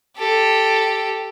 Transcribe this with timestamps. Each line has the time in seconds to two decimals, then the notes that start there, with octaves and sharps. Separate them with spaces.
0.17 G4 A4